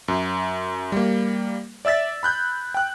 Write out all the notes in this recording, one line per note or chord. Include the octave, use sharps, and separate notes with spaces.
F#2
G3 A#3
D5 E5 E6 A6 B6
B5 F#6 G6
G5 F#6